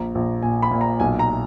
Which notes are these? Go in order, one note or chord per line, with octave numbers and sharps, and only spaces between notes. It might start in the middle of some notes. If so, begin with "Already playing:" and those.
Already playing: A#1 A#2 A#5
A#1
A#2 G#5
B5
A#2
A#5
B1 G#5
A#5